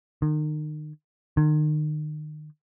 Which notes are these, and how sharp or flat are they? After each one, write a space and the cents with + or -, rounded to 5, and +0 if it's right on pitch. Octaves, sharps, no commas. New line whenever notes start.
D#3 -35
D#3 -35